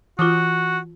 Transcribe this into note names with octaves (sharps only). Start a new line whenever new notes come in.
E3 F4 F#4 D6 D#6